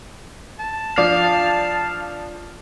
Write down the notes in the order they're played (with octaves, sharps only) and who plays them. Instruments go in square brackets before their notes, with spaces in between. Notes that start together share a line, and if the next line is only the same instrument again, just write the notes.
[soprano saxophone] A5
[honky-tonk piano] F3 D4 [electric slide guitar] F5